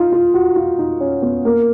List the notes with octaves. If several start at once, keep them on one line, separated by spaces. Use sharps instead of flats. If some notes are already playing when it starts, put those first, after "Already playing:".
Already playing: D#4 F4
F4
F#4
F4
D#4
C#4
B3
A#3